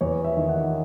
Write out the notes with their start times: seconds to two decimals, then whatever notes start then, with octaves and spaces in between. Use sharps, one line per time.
0.01 E2 C#5
0.24 E5
0.37 D#3
0.49 F#5